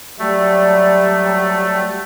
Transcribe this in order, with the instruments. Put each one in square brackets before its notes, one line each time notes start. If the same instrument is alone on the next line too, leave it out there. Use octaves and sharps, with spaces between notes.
[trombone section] F#3 G3 [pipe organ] A3